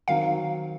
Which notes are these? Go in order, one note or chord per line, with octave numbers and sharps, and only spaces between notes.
D#3 F#3 C4 F5